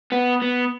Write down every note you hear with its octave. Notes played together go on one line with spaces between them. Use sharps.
B3
B3